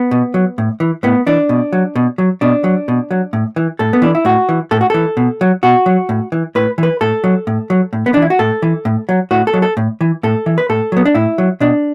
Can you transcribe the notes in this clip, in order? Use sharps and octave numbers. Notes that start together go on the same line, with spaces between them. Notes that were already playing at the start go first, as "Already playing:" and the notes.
Already playing: B3
B2
F#3
A2
E3
A2 B3
E3 D4
B2
F#3
B2
F#3
B2 D4
F#3
B2
F#3
A2
E3
A2 A4
B3
E3 D4
E4
A2 F#4
E3
A2 A4
F#4
E3 A4
B2
F#3
B2 F#4
F#3
A2
E3
A2 B4
E3
B4
A2 A4
F#3
A2
F#3
A2
B3
E3 D4
E4
F#4
A2 A4
E3
A2
F#3
A2 F#4
A4
F#3
A4
A2
E3
A2 A4
E3
B4
A2 A4
F#3 B3
D4
A2 E4
F#3
B2 D4